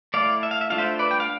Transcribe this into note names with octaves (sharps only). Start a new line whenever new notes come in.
A3 E4 D5 F5
E5
F5
E5
A3 D4 F4 F5
C5 E5
B4 D5
G5
F5